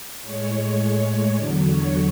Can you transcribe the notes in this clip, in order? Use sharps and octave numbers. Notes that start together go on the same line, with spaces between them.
A2 G#3 C#5
E2 D3 F#3 D4 D5
C#5